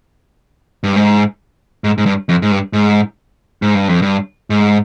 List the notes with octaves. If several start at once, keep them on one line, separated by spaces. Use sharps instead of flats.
G2
G#2
G#2
G#2
G2
F2
G#2
G2
G#2
G#2
G2
F2
G2
G#2